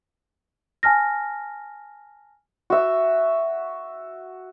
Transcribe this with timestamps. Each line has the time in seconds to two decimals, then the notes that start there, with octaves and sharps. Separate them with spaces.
0.83 G#5 A5 F6 A#6
2.70 F#4 E5